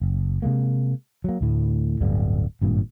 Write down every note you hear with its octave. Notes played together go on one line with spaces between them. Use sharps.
F#1
C3 F#3 G#3 A#3
F#3 A#3
D2 A2
D1 G1 G2 D3
G#1 G2 A#2